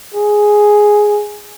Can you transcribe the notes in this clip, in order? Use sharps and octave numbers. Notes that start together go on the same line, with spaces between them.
G#4